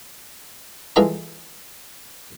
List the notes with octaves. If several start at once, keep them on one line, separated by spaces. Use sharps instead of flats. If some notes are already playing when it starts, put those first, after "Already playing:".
E3 G#3 F4 A4 A#5 D6